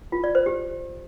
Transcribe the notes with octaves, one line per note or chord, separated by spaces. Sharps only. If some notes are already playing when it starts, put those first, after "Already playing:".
F4
D5
C5
G4